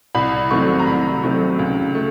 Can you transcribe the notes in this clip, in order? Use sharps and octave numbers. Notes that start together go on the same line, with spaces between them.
C2 B5
C3 D#3 F#3 A3 C#6
A#5
C2 B5
C3 D#3 F#3 A3
C#2
A3